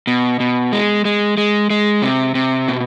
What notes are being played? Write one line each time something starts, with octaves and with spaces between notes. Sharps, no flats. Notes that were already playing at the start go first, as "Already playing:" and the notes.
B2
B2
G#3
G#3
G#3
G#3
C3
C3
B2